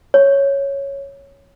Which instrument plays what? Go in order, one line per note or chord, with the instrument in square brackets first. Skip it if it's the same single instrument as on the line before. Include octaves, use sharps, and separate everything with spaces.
[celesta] C#5